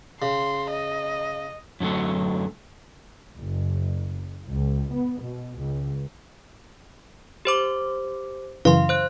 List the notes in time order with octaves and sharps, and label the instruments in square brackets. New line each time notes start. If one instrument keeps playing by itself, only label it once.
[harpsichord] C#3 [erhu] C6
[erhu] D#5
[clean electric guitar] F#2 D3 F#3 A3
[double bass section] F#1
C#2
B3
B2
C#2
[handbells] G4 C5 D6
[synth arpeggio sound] F#2 C#3 E3 [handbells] F5 C6
[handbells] C5 F#6